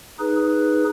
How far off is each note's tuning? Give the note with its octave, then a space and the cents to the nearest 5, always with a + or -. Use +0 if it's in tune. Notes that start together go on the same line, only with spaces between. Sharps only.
D#4 +0 G#4 +0 B4 +0